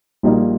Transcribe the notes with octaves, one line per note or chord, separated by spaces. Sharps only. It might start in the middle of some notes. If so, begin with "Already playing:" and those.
A#1 A#2 G3 A#3 D#4